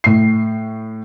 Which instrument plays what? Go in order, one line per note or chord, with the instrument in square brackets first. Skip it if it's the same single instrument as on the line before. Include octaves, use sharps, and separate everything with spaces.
[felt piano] A2 C7